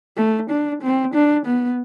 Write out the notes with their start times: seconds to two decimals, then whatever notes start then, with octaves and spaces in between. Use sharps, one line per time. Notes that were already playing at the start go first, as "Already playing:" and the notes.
0.17 A3
0.50 D4
0.82 C4
1.14 D4
1.46 B3